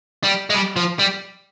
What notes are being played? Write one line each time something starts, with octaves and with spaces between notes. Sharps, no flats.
G3
G#3
G3
F3
G3